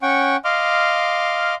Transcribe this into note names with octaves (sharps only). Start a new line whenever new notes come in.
C#4 F#5 G5 C#6
D#5 F5 C6 D6 F6